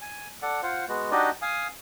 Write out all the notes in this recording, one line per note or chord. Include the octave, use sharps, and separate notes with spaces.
G#5
A4 D5 F#5
F4 C5 F#5
G#3 B3 F#4
D4 D#4 F#4 G4 D5 D#5
F5 G#5 D#6